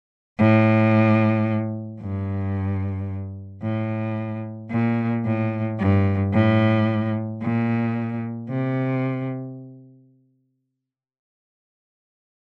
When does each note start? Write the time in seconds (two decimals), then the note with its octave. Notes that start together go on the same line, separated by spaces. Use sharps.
0.39 A2
2.00 G2
3.62 A2
4.71 A#2
5.25 A2
5.79 G2
6.33 A2
7.42 A#2
8.49 C3